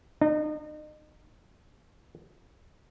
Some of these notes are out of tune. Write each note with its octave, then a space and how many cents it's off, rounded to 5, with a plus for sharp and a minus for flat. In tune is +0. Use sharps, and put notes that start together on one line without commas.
D#4 -35